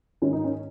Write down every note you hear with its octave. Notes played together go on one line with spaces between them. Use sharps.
G#2 D#3 C#4
D#4
C#4